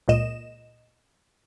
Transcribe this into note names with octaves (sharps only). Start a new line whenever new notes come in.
C#2 A#2 D#5 E7